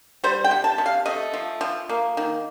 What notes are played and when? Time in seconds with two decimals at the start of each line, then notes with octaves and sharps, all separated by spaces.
0.24 G3 C5
0.44 G5
0.51 C3
0.64 A5
0.78 C3
0.86 F5
1.06 A3 D#5
1.33 F3
1.61 F3
1.89 A#3
2.17 D#3